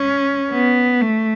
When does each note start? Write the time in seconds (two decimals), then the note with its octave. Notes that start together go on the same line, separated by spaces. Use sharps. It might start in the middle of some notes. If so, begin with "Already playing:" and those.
Already playing: C#4
0.51 B3
1.02 A3